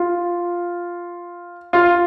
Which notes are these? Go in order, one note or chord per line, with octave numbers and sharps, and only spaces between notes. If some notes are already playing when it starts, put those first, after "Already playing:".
Already playing: F4
F4